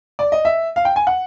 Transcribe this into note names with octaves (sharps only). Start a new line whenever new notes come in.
D5
D#5
E5
F5
G5
G#5
F#5